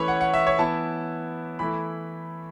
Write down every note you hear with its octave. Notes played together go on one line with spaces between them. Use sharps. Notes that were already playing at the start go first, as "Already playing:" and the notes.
Already playing: E3 A3 C#4 E4 B4 C#5 B5
F#5
F#5
E5
C#5
E3 B3 E4 A5
E3 A3 E4 B5